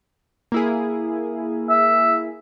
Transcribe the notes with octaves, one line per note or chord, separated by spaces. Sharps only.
A#3 E4 G#4
E5